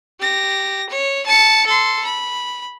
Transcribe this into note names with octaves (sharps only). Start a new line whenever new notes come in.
G4 A#6
C#5
A5 C#7
A4 C6
B5